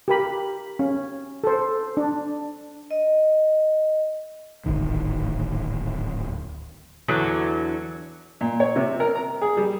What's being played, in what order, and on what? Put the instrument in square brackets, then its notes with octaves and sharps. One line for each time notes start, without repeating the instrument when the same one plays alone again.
[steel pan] G4 A#4 B5
C#4
A4 C5
D4
[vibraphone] D#5
[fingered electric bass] D1 G#1 D2 D#3
[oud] E2 D3 F#3
[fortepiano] A#2
C#5
C3
A#4
A#5
G#4
G3